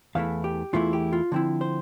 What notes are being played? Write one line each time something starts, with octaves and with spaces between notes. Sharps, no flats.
E2 E3 A3 E4 F5
G4
E2 E3 A3 E4 F4
G4
F4
D3 F3 C4 E4
C5